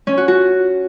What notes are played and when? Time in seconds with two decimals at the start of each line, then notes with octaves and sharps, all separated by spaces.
0.07 C#4
0.17 F#4
0.28 F#4